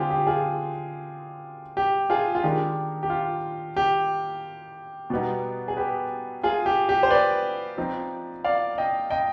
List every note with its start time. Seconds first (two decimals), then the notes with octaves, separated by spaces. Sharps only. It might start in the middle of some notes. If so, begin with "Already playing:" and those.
Already playing: D3 G#3 C4 F4 G4 G#4
0.10 G4
0.27 F4 G#4
1.77 G4
2.10 F4 G#4
2.35 F4
2.43 D#3 G#3 D4 G4
3.03 G4
3.10 F4
3.76 G4
5.10 B2 G3 B3 D#4
5.68 G#4
5.77 G4 B4
6.43 F4 G#4
6.66 G4
6.89 G4
7.03 C5
7.10 B4 D5
7.78 F3 C4 D#4
8.44 D5 F5
8.78 D#5 G5
9.10 D#5 G5